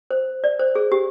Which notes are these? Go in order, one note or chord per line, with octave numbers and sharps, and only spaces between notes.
C5
D5
C5
G#4
G4